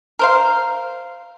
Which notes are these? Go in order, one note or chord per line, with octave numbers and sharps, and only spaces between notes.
A#4 C5 F5